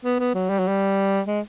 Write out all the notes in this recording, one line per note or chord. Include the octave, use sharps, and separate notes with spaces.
B3
B3
F#3
G3
F#3
G3
G#3